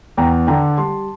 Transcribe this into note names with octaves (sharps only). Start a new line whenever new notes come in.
E2 G5 A#5
D3 G5 A#5
G3 A5 C6